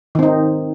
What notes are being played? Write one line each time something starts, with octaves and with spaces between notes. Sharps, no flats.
D#3 C4 D#4